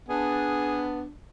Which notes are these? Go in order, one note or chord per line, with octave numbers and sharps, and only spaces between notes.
B3 D4 G#4